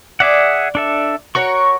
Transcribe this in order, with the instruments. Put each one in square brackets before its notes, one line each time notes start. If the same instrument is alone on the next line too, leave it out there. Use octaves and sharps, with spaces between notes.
[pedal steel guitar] G#4 E5 F#5 [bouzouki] D5
[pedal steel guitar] D4 A4 E5
[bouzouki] F#4 A#4 C#5 [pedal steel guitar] C#6